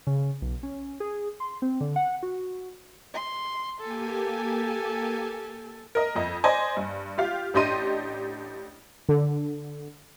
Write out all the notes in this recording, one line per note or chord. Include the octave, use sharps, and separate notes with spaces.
C#3
B1
C#4
G#4
C6
C4
D3
F#5
F#4
C6
A#3 G4 A4 G#5
A#4 D#5
F2 D#5
C5 D5 D#5 G#5
G2
F4 G4 F5
A1 D4 G4 D#5 C6 D#7
D3